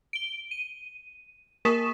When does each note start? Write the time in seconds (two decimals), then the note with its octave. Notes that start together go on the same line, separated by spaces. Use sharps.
0.13 D7 G7
0.51 D#7
1.65 A#3 A#4 C#6 D#6 B6 E7